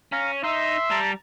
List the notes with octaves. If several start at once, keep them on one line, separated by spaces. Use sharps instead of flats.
C#4 F5 A#5
D#4 E5 C6 E6
G3 A5 A#5